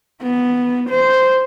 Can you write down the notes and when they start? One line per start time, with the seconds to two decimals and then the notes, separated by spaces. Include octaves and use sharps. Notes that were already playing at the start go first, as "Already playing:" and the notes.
0.23 B3
0.90 C5